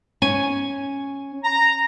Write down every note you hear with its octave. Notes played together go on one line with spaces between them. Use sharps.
C#4 G#5
A#5